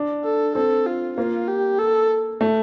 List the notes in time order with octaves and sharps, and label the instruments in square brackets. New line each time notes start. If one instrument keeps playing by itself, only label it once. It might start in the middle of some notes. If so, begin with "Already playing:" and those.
Already playing: [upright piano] D4
[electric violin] A4
[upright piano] C4 [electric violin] A4
[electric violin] F4
[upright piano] A#3 [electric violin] F4
[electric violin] G4
A4
[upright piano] A3